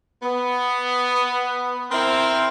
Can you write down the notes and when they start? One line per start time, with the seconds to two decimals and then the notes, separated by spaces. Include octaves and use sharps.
0.23 B3
1.91 C4 E4 A#4 C5